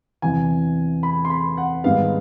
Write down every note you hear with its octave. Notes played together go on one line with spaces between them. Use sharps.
E2 C3 E3 G#5
B5
C6
B5
F#5
G#2 D#3 G3 B3 F5